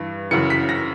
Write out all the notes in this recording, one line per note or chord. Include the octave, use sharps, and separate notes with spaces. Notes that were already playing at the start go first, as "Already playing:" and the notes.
Already playing: G2 E3
F#2 C#3 E3 C#7
B6
A#6